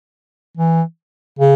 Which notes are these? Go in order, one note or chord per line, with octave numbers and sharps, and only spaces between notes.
E3
C#3